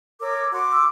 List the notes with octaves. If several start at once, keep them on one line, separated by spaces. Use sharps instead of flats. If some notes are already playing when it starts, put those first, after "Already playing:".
A#4 C#5 D6 E6
F#4 C6 D6
E6